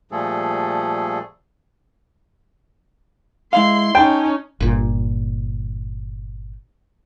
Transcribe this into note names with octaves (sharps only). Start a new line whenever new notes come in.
A#2 F3 G3 A3 G#4 A4
G#3 E4 F5 C6
C#4 D#4 G5 A5
G1 A#2